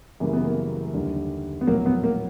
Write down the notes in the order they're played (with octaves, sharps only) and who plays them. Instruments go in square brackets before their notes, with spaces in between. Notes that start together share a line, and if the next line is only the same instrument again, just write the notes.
[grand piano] F#2 C#3 E3 G3 [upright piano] A#3
[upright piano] B3
A#3
[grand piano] D#2 D3 G3
[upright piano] B3
[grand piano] A#1 A2 F#3 [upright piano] A#3
[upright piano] B3
A#3